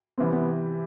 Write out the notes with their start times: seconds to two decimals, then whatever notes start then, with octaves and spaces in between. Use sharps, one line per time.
0.18 C3 E3 G3 B3 C4
0.32 B3